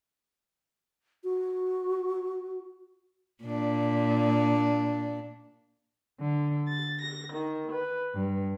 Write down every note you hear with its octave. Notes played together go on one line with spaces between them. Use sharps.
F#4
A#2 D4
D3
A6
A#6
D#3
B4
G2